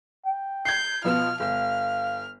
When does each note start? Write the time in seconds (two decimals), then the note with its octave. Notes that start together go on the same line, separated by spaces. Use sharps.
0.26 G5
0.65 G6 G#6 C7
1.04 B2 F3 B3 F4 F6
1.40 G1 F5 F6